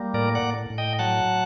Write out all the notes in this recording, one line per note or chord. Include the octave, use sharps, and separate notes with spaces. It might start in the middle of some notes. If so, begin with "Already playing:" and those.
Already playing: G3 A#3
A2 A#4 D5
D5 F#5
A2
A2
D#5 G5
F#3 F#5 A5